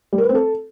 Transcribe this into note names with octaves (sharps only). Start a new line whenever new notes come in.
G3
A#4
B4
C4
A4